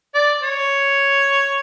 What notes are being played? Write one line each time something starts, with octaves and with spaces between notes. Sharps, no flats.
D5
C#5